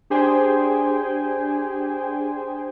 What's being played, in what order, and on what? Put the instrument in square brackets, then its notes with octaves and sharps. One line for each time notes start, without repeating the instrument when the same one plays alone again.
[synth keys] D4 G4 G#4 C5 G5 G#5